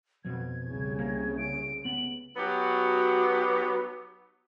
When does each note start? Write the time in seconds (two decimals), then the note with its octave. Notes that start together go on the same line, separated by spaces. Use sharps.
0.25 F2 B2 F3 G#6
0.62 C2 C#3
0.99 A#3
1.38 D7
1.85 B3 F#7
2.36 F#3 B3 D#4 F#4 G4